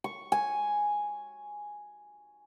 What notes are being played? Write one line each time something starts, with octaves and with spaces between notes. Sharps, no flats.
C#6
G#5